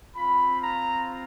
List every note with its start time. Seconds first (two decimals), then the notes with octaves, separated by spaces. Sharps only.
0.15 C4 F4 B5
0.61 A#5